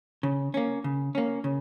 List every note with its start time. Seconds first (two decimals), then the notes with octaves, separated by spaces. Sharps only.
0.23 C#3
0.54 A#3 C#4
0.84 C#3
1.15 A#3 C#4
1.44 C#3